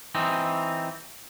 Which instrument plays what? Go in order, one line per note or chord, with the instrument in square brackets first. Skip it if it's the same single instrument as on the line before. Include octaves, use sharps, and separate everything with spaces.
[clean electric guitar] E3 C4 D#4